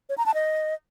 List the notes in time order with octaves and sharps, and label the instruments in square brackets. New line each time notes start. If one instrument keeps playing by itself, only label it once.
[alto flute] C#5
A#5
A5
D#5